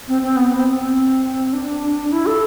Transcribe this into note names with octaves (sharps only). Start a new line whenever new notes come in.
C4
C4
B3
C4
C4
D4
E4
A4